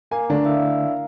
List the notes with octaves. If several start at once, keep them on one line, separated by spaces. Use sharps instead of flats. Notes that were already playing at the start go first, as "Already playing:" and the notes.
A#3 G#5
D3 A3 D4 A#4
E4 F5